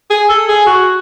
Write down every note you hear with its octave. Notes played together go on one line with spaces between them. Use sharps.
G#4
A4
G#4
F#4